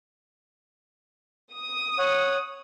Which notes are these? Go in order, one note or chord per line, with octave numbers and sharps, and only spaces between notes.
D#6
C#5 F#5